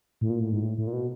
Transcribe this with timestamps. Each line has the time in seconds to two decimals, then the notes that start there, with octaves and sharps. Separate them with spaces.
0.21 A2
0.30 A#2
0.41 A2
0.52 G#2
0.61 A2
0.78 A2
0.87 A#2
0.93 B2